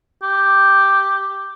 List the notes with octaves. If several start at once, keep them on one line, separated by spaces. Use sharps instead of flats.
G4